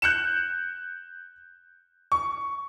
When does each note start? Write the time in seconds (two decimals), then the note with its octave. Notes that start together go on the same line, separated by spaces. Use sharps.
0.02 F#6 G6 C#7 E7
2.12 C#6